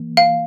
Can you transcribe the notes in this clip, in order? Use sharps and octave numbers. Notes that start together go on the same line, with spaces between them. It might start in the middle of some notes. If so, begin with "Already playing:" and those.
Already playing: E3 A#3
F5